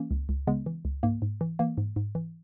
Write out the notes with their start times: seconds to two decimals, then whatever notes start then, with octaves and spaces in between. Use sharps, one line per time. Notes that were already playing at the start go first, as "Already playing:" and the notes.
Already playing: E3 A#3 C#4
0.11 C#2
0.29 C#2
0.47 C#3 G#3 B3
0.66 E3
0.85 C#2
1.03 G#2 A#3
1.22 G#2
1.41 E3
1.59 E3 A#3
1.78 G#2
1.96 G#2
2.15 E3